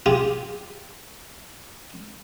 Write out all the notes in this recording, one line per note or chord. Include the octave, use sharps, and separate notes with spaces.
F4 G4 G#4